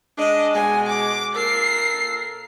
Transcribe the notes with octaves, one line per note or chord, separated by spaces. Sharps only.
G#3 D4 D#5
B2 G#3 G#5
D6
A#2 A4 A#4 C7